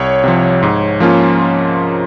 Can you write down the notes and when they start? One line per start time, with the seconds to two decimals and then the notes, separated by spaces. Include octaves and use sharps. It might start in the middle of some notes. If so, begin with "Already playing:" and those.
Already playing: C2 C#5
0.24 C3 F3
0.63 G#2
1.00 F3 A#3 C#4 F4